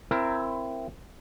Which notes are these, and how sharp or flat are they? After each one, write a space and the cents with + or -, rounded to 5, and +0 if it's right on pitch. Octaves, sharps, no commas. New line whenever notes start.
C4 +0 E4 +20 A#4 +0